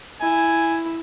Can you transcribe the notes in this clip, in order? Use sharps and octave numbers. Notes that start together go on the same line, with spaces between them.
E4 G#5